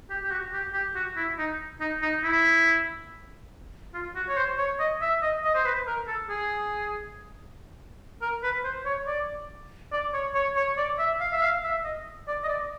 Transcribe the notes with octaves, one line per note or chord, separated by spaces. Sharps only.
G4
G4
F#4
G4
G4
F#4
E4
D#4
D#4
D#4
E4
F4
F#4
C#5
C5
C#5
D#5
E5
D#5
D#5
C5
B4
A#4
A4
G#4
A#4
B4
C5
C#5
D5
D5
C#5
C#5
C#5
D5
E5
F5
E5
F5
E5
D#5
D5
D#5
D5